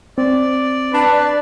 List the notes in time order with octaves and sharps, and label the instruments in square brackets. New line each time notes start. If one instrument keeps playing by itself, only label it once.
[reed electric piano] C4 [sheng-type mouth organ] D5
[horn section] D4 B4